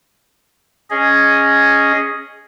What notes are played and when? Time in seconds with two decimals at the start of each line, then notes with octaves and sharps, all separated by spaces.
0.90 C#4 G#4 D#5